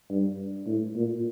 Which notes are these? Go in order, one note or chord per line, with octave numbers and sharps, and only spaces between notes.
G2
A2
A#2